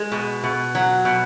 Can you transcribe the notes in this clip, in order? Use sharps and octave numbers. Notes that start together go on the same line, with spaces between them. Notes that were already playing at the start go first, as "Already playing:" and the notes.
Already playing: G#3
B2
B2
F#3
B2